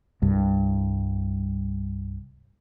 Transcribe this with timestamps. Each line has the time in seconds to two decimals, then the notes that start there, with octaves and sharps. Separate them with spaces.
0.22 C2 G2